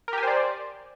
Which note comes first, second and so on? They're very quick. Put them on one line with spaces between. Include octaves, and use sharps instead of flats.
A#4 G4 G#5 C5 D5